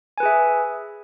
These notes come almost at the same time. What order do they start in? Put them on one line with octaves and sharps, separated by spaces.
G#5 B4 G#4 E5